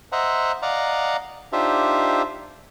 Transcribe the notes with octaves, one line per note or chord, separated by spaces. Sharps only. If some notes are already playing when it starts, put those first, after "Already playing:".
C5 D#5 E5 F#5 A#5
D5 D#5 F5 F#5 A#5
D4 D#4 F4 G4 C5 E5